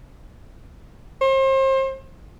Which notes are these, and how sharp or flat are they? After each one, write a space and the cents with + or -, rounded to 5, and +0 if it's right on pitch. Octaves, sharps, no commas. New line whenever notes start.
C5 +35